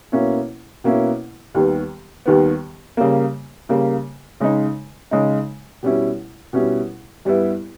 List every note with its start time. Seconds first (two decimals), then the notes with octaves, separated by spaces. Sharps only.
0.12 B2 A#3 C#4 E4
0.84 B2 A#3 C#4 E4
1.55 D#2 D#3 G3 B3
2.26 D#2 D#3 G3 B3
2.97 C#3 G3 A#3
3.69 C#3 G3 A#3
4.40 C#3 G#3 D#4
5.11 C#3 G#3 D#4
5.83 B2 G3 C#4 E4
6.53 B2 G3 C#4 E4
7.25 G2 G3 B3 E4